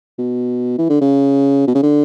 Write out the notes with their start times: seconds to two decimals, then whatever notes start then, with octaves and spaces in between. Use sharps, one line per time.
0.19 B2
0.78 E3
0.90 D3
1.01 C#3
1.67 B2
1.75 C#3
1.83 D3